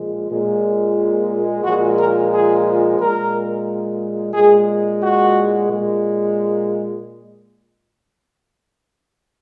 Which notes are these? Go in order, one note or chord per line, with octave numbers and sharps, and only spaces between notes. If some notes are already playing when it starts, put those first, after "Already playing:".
Already playing: A#2 F3 G#3
A#2 G#3
A#2 F3 G#3 F#4
A#4
G#4
A#2 G#3 A#4
A#2 G#3 G#4
F#4
A#2 G#3